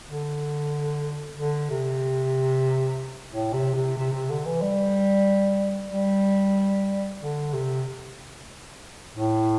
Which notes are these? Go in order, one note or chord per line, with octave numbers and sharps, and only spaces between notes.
D3
D3
C3
A2
C3
C3
C3
C3
D3
E3
G3
G3
D3
C3
A2